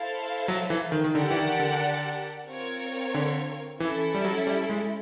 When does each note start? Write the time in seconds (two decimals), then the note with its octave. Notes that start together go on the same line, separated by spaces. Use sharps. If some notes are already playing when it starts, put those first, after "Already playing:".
Already playing: E4 A4 C5 F5 A5
0.48 F#3
0.70 E3
0.92 D#3
1.04 D#3
1.15 D3 G4 A#4 D5 F#5 A5
1.30 E3
1.37 D#3
1.60 D3
2.47 C4 F4 A#4 C#5
3.14 D3
3.80 E3 C#4 E4 A4
4.14 G3
4.25 F#3
4.47 G3
4.70 G#3